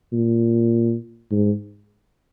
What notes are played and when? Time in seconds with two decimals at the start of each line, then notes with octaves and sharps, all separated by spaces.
0.13 A#2
1.31 G#2